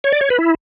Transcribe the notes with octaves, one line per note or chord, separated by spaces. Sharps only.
C#5
D5
C#5
B4
E4